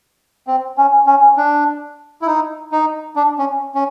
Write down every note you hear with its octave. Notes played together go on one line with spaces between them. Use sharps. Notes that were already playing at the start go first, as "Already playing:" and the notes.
C4
C#4
C#4
D4
E4
D#4
D#4
D4
C#4
C#4